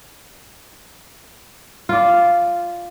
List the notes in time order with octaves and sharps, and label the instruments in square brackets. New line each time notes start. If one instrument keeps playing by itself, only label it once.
[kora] F4 D5